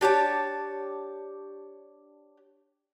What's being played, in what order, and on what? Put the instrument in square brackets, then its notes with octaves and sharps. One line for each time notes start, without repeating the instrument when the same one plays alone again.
[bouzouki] D4 G4 C#5 A5